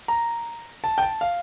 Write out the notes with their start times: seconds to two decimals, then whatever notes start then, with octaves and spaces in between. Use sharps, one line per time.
0.08 A#5
0.84 A5
0.98 G5
1.02 A5
1.21 F5